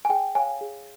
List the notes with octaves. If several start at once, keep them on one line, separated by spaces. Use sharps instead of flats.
G#5
G#4 G5
C#5 F5 G#5
G#4